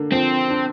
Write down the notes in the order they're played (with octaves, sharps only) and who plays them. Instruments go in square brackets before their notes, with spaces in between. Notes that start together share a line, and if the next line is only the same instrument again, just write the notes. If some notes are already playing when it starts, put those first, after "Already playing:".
Already playing: [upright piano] D3 A#3
[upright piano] F3 [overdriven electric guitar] C4
[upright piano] D4